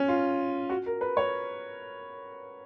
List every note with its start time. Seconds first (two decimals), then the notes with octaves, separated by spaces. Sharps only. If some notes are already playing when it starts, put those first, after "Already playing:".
Already playing: C#4
0.08 F4
0.70 F#4
0.86 A#4
1.01 B4
1.17 C#5